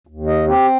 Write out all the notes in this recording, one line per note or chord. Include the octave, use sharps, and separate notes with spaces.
D#2
D#5
C4 G4